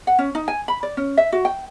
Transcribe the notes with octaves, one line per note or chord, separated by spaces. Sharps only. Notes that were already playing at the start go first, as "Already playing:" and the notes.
F#5
C#4
D#4
G#5
B5
D5
C#4
E5
F#4
G5